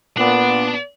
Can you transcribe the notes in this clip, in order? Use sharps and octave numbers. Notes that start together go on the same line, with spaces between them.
A#2 B3 D4 D5